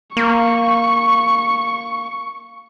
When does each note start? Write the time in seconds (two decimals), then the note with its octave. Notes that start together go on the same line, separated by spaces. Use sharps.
0.17 A#3 C#6